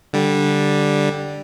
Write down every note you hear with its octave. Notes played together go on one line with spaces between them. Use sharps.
D3 G3